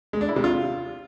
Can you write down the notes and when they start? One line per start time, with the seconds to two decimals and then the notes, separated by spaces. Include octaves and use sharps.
0.13 G#3
0.21 D4
0.29 E4
0.36 C3
0.44 F4